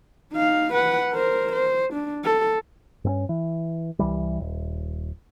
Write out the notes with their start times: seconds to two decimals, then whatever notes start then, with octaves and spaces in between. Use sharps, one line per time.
0.32 D#4 F5
0.73 B4 F#5
1.13 A#4 C5
1.53 C5
1.93 D4
2.24 A4
3.04 G2 C4 C#4
3.29 E3
3.99 C2 E3 G3
4.40 D#1